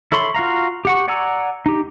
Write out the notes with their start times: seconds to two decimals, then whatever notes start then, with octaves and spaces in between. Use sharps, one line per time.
0.12 E4 A4 C#5 B5 C6
0.34 F4 F#4 F5 A#5
0.85 G4 F#5 C#6
1.08 D5 F#5 G#5 A#5 E6
1.66 D#4 G4